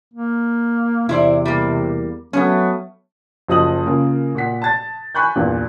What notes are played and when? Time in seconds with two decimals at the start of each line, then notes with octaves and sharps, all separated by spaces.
0.13 A#3
1.09 E2 C3 E4 C5 D5
1.45 G3 A#3
2.33 F#3 A3 B3 C#4
3.48 F#1 F3 D#5 D#6 F#7
3.86 C#3 A#3 F4 A#4
4.35 A#2 F#5 B6
4.62 A5 A6
5.15 G#5 B5 C#6 F#6 G6
5.36 E2 G2 A#2